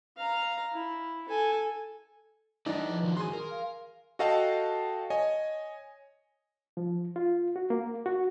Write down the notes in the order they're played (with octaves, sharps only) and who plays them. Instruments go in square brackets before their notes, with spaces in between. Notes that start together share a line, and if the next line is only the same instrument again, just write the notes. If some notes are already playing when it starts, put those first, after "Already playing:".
[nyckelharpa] F5 A#5
E4
A4 G#5
[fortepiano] E3 D4 D#4 [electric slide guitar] B4 D5 E5
[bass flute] F3
[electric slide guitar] D#3 E3 F#4
[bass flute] G#4 [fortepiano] G#5 C6
[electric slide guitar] A#4
[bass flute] F5
[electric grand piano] F#4 A4 D#5 F5 G5 A5
C#5 D#5 G#5
[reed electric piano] F3
F4
F#4
A#3
F#4